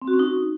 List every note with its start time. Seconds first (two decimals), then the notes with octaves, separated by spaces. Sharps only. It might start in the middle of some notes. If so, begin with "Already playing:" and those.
0.02 C4
0.08 F#4
0.13 C#4
0.19 D#4